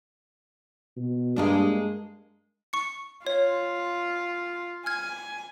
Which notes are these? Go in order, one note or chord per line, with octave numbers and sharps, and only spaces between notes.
B2
G2 G#3 A#3 D4
C#6 C#7
F4 C#5
G#5 F6 G#6